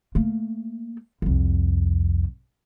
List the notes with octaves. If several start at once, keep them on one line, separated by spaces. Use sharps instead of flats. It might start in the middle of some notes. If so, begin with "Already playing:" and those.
A3 A#3
C2 F2